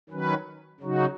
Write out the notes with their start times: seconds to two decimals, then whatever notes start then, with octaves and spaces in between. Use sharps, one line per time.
0.10 D#3 F#3 C#4 B4
0.80 C#3 F#3 D#4 F#4